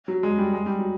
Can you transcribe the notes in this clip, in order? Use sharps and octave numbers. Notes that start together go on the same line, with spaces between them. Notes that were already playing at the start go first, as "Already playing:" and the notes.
F#3
G#3
G3
G#3
G3
F#3